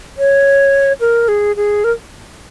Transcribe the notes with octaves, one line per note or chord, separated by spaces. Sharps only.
C#5
A#4
G#4
G#4
A#4